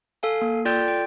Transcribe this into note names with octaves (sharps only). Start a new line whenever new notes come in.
A4 F5 G#5
A#3
F4 A4 D5 G5 G6
G5